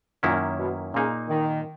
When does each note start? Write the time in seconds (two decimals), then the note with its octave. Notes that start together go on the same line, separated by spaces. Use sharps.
0.23 F#2 A#2 D#3 A#3 C#4 E4
0.59 B2
0.94 A#2 C#3 A#3 D#4
1.29 D#3